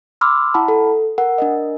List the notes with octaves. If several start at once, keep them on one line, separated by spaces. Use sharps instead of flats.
B5 C6 D6 E6 F6
E4 F#5 A5 B5
A4
A#4 F#5
D4 A#4 D#5